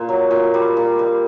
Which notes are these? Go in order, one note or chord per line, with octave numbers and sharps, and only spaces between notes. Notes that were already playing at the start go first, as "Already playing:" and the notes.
Already playing: A#2
F#3
A#2
G3
A#2
G3